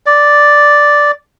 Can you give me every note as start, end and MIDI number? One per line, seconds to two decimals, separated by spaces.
0.06 1.11 74